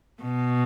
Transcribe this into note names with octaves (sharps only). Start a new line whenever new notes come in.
B2